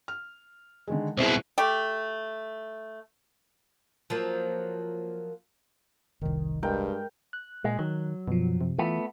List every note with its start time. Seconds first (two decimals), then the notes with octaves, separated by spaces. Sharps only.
0.08 F6
0.88 D3 D#3 G#3
1.18 C2 B2 C4 E4 G#4
1.58 A3 G4
4.10 F3 F#3 A#3
6.21 F1 C2 D#3
6.63 G2 G#3 A#4 G5
7.33 F#6
7.64 A#2 G#3
7.79 D#3 F#3
8.28 F#2 B2 F3
8.61 C3
8.79 E3 A3 B3 F4